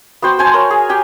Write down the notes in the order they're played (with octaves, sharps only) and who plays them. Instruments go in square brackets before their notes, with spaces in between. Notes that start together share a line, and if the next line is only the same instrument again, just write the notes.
[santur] B3 F#4 C5 G5
C5 G#5 A5 C6
A#4 C#5
G#4
G4 G5 G#5